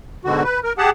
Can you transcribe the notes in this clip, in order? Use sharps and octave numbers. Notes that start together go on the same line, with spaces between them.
G#2 B2 D3 F#4
B4
A#4
G4 G#4 F#5 A5